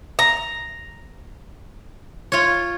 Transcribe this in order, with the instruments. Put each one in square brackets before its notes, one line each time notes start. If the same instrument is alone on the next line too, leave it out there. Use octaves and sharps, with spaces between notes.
[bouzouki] A#5
[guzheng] F4 C#5